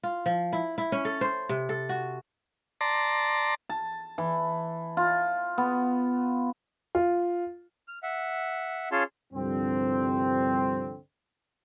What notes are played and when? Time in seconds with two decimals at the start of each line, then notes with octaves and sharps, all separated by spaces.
0.03 F4
0.26 F3
0.53 E4
0.78 E4
0.92 C#4
1.05 A4
1.21 C5
1.49 C3
1.69 A4
1.89 F#4
2.81 D5 A5 A#5 C6
3.69 A5
4.18 E3
4.97 F4
5.58 B3
6.95 F4
7.88 F6
8.03 E5 F#5
8.91 C#4 F4 G#4 C#5 A5 C6
9.34 C2 G2 D3 F3 C4